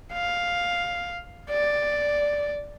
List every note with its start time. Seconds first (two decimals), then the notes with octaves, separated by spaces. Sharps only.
0.13 F5
1.50 D5